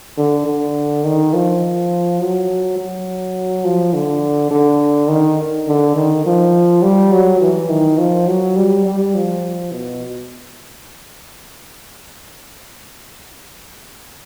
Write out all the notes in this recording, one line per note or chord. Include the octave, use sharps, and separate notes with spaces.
D3
D3
D#3
F3
F#3
F#3
F3
D3
D3
D#3
D3
D#3
F3
G3
F#3
E3
D#3
F3
F#3
G3
G3
F3
B2